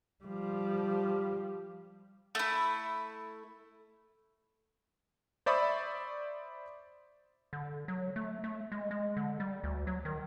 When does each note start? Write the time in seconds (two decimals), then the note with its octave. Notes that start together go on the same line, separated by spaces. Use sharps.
0.24 F3 G3
2.35 A3 E4
5.46 C5 D5 E5 B5 C#6 D#6
7.53 D3
7.88 F#3
8.16 A3
8.44 A3
8.72 G#3
8.91 G#3
9.17 D3
9.40 G3
9.64 D2
9.87 F#3
10.05 D#3